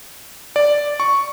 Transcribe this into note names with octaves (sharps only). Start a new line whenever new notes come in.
D5
C#6